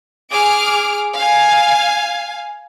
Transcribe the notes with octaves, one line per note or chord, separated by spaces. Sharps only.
G#4 D6 F6
F5 G#5